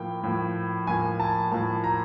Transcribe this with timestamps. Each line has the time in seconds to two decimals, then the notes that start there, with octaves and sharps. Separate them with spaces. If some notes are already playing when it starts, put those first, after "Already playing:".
Already playing: A2 F3 A#3 G5
0.24 A2 F3 A#3
0.87 A2 F3 A#3 G#5
1.20 A5
1.52 A2 F3 A#3 A5
1.84 A#5